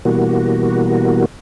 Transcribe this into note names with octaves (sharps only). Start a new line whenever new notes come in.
B2 E3 G3 A#3 F#4